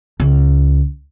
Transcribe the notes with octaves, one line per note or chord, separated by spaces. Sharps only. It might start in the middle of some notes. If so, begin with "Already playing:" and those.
C#2